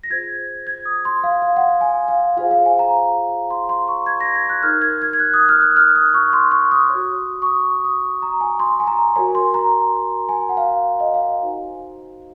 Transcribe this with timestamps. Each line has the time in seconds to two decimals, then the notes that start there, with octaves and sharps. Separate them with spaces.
0.04 A#6
0.10 F4 G#4 C5 G#6
0.67 G#6
0.85 D#6
1.05 C6
1.24 F5
1.42 F5
1.57 F#5
1.61 F5
1.81 G#5
2.08 F5
2.37 F4 G#4 C5 F5
2.51 F5
2.66 G#5
2.79 A#5
3.50 C6
3.69 C6
3.88 C#6
4.06 G#6
4.20 A#6
4.35 G#6
4.49 F#6
4.63 D#4 A#4 C#5 F6
4.82 G#6
5.02 G#6
5.13 G#6
5.19 F#6
5.34 D#6
5.49 F6
5.62 F#6
5.76 F6
5.95 D#6
6.14 C#6
6.33 C6
6.52 C#6
6.71 D#6
6.90 F#4 C#5
7.42 C#6
7.46 D#6
7.85 D#6
8.22 A#5
8.41 G#5
8.60 C6
8.80 G#5
8.87 A#5
9.16 F#4 A#4 C#5 G#5
9.35 C6
9.54 A#5
10.29 G#5
10.49 F#5
10.57 F5
11.00 D#5
11.14 F5
11.42 D#4 F#4 C5